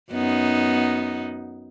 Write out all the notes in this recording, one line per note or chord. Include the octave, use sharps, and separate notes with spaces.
F#2 B3 D#4